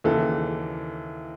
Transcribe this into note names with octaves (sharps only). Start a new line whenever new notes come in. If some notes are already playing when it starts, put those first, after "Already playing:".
D#2 C#3 E3 A4